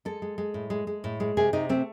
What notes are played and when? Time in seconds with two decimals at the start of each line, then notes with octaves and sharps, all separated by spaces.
0.05 G#3 A4
0.22 G#3
0.38 G#3
0.54 A2
0.70 G#3
0.87 G#3
1.04 A2
1.20 G#3
1.37 C3 G#4
1.53 C3 D#4
1.69 A3 C4